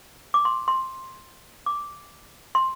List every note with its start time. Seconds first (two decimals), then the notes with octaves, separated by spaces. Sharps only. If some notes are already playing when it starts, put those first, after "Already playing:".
0.34 D6
0.45 C6
0.68 C6
1.66 D6
2.55 C6